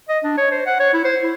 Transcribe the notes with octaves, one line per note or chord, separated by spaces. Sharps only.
D#5
D4
C#5
C5
F#5
C#5
E4
C5
E4